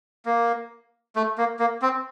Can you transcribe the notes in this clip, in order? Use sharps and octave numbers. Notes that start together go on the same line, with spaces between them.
A#3
A3
A#3
A#3
C4